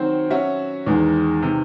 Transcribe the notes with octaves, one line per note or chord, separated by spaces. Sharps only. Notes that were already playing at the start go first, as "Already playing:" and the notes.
Already playing: D#3 F#3 C4 F#4 C5
F#3 C#4 F#4 C#5 E5
E2 D#3 G#3
C3 D#3